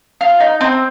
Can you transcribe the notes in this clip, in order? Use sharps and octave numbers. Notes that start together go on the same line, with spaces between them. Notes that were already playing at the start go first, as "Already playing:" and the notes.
F4
D#4
C4